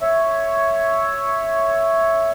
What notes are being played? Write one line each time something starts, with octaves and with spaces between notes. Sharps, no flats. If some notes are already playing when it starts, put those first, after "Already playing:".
C#5 E5